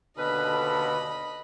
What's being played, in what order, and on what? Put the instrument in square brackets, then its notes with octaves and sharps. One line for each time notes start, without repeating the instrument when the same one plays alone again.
[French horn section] D#2 B2 D3 [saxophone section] C#4 A4 B4 [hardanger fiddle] D#5 B5